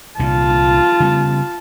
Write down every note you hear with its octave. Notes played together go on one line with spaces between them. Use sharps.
C2 A#2 D3 F4 A5
C#3 G3 B3